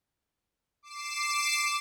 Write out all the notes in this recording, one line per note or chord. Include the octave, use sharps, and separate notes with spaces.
D6 C7 E7